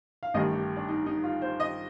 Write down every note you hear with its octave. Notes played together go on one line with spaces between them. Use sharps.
F5
A1 G2 D#3 A3 D#5
G4
D4
D#4
D#4
F4
C5
D#5